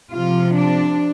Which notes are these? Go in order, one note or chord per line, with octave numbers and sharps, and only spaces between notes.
C3 F3 F4
D4